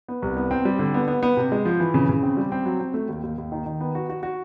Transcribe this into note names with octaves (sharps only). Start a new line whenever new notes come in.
B3
C2
B3
C4
G3
D3
B3
B3
B3
C3
G#3
F3
E3
C#3
C#3
C4
G3
C4
F#3
C4
A3
D#2
D#2
D#2
D#3
D#3
B3
F#4
F#4
F#4